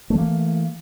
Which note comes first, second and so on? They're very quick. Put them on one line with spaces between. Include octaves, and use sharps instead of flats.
A3 E3 A#3